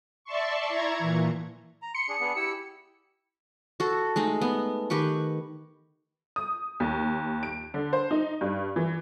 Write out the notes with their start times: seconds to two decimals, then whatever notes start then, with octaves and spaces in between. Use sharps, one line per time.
0.24 D5 E5 A5 C6 C#6
0.68 E4 A#5 C#6 G#6
0.99 A#2 E3
1.82 A#5
1.95 C6 C#7
2.09 D4 G#4
2.20 B3 D4 G#4
2.36 E4 G4 E6
3.80 F#4 A4
4.16 G#3 A3 D#4
4.41 B3
4.90 D#3 G4 B4 C#6
6.36 D#6
6.80 D#2
7.43 D7
7.74 D3
7.93 C5
8.11 D#4
8.41 G2
8.76 E3